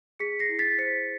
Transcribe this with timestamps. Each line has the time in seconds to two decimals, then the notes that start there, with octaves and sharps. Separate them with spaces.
0.19 G#4 B6 C#7
0.39 A#6 C7
0.49 E4
0.59 A6 B6
0.78 C5 B6 C#7